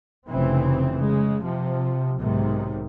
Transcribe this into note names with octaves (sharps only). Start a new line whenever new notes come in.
F1 C#3 E3 C4
C#3 G#3
C3 F3
B1 G#2 C3 D#3